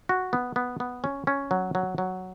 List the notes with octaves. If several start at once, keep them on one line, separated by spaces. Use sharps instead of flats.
F#4
B3
B3
B3
C#4
C#4
F#3
F#3
F#3